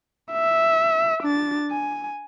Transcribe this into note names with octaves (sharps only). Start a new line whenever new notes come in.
E5
D4 A6
G#5